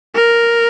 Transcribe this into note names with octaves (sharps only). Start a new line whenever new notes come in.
A#4